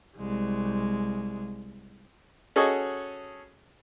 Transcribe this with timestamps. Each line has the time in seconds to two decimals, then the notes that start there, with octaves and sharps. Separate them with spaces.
0.18 C2 G#3
2.56 C#4 F#4 G#4 A4 C#5 D#5